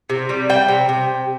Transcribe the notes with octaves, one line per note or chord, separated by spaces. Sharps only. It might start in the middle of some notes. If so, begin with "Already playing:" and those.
C3
G3
G3 G5
C3
C3